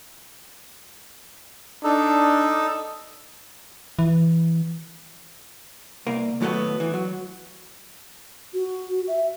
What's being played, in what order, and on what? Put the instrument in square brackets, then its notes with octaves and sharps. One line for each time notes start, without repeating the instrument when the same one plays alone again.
[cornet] D4 [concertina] D#4 A4
[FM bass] E3
[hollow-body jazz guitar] C2 A#3
D#2 A2 F#3 G3 A3 B3
E3
F#3
[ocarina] F#4
E5